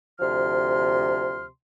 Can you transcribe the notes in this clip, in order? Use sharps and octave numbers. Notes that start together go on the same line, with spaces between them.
D2 C3 F3 C6 F6